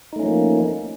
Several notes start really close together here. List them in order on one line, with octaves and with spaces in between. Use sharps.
D#4 A3 C#4 F3 A#3